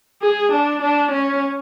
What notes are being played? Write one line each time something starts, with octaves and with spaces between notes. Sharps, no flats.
G#4
D4
D4
C#4